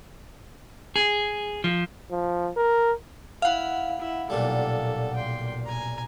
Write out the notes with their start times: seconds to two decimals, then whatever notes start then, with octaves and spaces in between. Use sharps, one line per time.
0.96 G#4
1.64 F3
2.11 F3
2.57 A#4
3.42 E4 F5 F#5
3.99 E4
4.30 B1 A#2 G3 A4
5.16 G5 C6
5.66 G#5 A#5